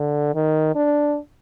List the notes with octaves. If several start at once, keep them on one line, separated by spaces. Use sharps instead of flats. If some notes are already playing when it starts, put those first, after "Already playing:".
Already playing: D3
D#3
D4